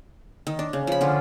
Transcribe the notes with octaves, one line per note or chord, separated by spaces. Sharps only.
D#3
D4
C#3
F3 B5
D3 C#4 F4